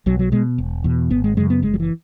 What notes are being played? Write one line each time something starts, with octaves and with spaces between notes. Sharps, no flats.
B1 F#3
F#3
B2 G#3
E1
E2 B2
G#1 B3
G#3
F#2 C#3 G#3
B3
F#1 G#3
F#3
E3